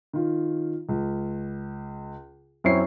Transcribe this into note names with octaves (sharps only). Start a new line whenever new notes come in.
D#3 F4
C#2
F#2 C4 E4 C#5 C#6 C7